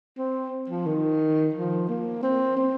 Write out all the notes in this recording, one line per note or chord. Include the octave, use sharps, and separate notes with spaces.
C4
F3
D#3
F3
A#3
C4
C4